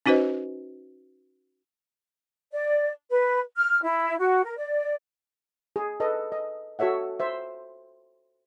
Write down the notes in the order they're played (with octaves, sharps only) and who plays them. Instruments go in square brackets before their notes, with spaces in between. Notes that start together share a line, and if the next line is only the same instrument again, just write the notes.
[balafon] C#4 D#4 F#4 B4 C5 D#5
[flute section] D5
B4
F6
E4
F#4
A#4
D5
[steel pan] G#4
A4 B4 D#5
D#5
F#4 A4 C#5 E5 F#5
C5 E5